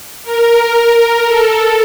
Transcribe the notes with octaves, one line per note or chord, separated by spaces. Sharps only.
A#4
A4